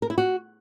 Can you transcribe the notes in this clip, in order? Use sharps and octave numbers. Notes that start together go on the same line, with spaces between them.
A#4
E4
F#4